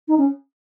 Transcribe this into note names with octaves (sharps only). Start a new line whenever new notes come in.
D#4
C#4